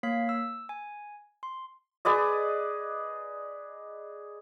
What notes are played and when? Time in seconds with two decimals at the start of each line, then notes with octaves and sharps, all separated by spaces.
0.03 A#3 C#5 F5 B6
0.29 E6
0.69 G#5
1.43 C6
2.05 G#4 B4 D5 D#5